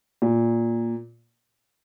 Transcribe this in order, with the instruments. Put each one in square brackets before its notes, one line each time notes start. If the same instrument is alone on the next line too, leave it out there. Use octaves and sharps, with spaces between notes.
[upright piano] A#2